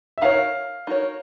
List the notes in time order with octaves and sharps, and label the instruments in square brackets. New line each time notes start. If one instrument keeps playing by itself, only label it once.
[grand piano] E5
[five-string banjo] D#4 F#4 A#4 C#5 [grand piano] F5
[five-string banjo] D#4 F#4 A#4 C#5